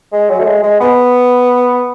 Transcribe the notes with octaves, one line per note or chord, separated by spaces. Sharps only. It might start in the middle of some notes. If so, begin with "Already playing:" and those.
G#3
F#3
A3
G#3
G#3
B3